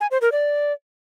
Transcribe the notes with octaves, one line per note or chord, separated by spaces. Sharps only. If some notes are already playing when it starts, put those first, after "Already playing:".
G#5
C5
A#4
D5